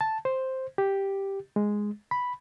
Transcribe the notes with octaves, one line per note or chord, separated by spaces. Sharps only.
A5
C5
G4
G#3
B5